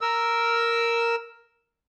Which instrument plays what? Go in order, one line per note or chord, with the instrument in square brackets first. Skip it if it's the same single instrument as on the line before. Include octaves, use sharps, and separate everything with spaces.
[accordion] A#4 E6